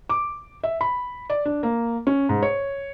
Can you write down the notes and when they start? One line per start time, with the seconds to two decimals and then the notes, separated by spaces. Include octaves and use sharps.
0.09 D6
0.63 E5
0.81 B5
1.30 D5
1.45 D4
1.63 A#3
2.07 C#4
2.29 G#2
2.43 C#5